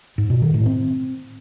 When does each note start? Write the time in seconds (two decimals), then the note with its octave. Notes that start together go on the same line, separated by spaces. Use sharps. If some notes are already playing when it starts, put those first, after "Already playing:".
0.18 G#2
0.30 B2
0.42 D#3
0.54 A2
0.66 C4